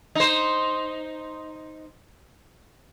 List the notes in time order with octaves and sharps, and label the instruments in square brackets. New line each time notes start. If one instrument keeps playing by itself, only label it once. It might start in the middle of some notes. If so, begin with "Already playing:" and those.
[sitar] D#4 C5